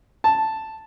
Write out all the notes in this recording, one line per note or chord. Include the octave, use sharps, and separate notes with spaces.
A5